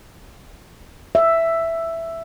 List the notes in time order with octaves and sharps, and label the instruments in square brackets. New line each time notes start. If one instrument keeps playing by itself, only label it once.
[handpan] E5